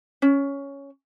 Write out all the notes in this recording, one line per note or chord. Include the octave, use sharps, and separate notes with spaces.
C#4